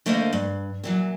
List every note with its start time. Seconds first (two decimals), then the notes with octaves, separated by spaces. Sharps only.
0.06 D3 A3 A#3 C5 D#5 F5
0.33 G2
0.84 A#2 E3 F#3